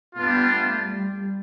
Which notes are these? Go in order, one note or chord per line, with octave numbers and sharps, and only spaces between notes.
G3 B3 D4 F4
A3
G3